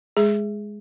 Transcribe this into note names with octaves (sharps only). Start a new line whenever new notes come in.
G#3 G#4